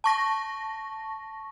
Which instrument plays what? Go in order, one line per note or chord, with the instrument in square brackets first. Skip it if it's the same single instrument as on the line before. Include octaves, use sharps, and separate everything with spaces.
[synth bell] A5 C#6 A#6